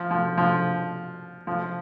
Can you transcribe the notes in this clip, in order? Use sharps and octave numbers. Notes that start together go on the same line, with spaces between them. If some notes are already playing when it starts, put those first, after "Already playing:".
Already playing: F3
F3
F3
F3